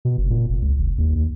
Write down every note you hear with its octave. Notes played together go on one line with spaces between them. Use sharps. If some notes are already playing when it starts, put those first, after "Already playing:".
B2
F#1
A#2
F1
C#2
F1
D#2
D#2